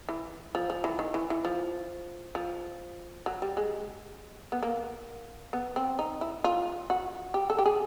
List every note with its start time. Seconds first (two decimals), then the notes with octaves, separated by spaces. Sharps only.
0.09 E3
0.55 F3
0.70 F3
0.84 E3
0.99 D#3
1.14 E3
1.30 E3
1.45 F3
2.35 F3
3.26 F#3
3.42 G3
3.57 G#3
4.52 B3
4.63 A#3
5.53 B3
5.76 C4
5.99 D#4
6.21 E4
6.44 F4
6.90 F#4
7.34 G4
7.50 A4
7.59 G4
7.66 G#4